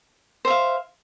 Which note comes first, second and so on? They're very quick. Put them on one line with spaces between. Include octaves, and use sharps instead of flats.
C5 E5 F5